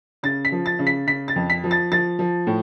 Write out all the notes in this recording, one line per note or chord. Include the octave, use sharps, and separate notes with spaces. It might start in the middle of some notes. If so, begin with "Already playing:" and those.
C#3 A6
B6
F3
A6
C#3
B6
C#3 B6
A6
F2
B6
F3
A6
F3 A6
F3
A2